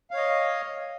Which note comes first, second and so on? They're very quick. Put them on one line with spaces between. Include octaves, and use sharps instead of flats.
F5 C#5 D#5